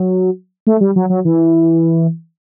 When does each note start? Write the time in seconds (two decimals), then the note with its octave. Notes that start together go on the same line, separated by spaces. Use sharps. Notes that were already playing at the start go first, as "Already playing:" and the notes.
Already playing: F#3
0.67 A3
0.81 G3
0.96 F#3
1.10 F#3
1.25 E3